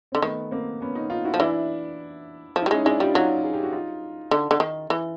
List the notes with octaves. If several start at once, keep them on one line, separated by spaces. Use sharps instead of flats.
D3 C4
D#3 A3 B3
A#3 C4
B3 C#4
C#4 D#4
D#4 F4
E4 F#4
F3
E3 D4 E4
F3
E4
G3
G#3 C#4 D#4
G#3 D4 E4
G3 D#4 F4
F#3 D#4 F4
G#4
G4
F#4
D#4 F4
D3
D3
D#3
E3